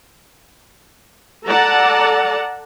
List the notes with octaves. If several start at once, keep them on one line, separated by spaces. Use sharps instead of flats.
A4 D5 F#5 A5 A#5